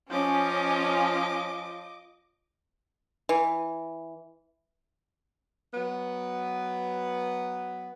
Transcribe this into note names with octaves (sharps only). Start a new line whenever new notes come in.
F3 C#4 D#5 D6
E3
F#3 B3